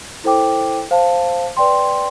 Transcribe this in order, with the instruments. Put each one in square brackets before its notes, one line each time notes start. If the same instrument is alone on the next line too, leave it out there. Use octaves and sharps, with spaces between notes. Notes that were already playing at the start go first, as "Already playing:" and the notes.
[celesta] E4 A4 C5 G5 D6
C5 F5 A5
B4 D5 G5 C6